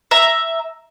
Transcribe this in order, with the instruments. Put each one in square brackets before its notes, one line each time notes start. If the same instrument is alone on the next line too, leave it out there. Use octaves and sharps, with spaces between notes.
[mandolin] E5 A#5